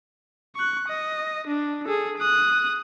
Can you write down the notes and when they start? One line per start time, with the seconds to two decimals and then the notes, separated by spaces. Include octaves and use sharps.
0.56 C#6 F#6
0.88 D#5
1.47 D4
1.85 G#4 A4
2.18 D#6 F#6